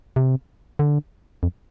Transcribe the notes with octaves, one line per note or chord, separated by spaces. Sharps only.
C3
D3
F2